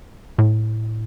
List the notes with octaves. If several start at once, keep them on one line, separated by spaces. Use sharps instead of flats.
A2